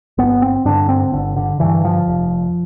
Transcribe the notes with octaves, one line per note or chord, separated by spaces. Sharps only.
G1 B3
C4
G2 D3 D4
C4
G1 D3
D3
G2 D3 E3
F3
F1